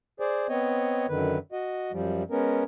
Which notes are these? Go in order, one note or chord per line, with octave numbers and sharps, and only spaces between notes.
G#4 C5 D5
B3 C4 C#5 D#5
F#2 D3 D#3 B4
F#4 D#5
F#2 F3 G3
G#3 B3 C#4 A#4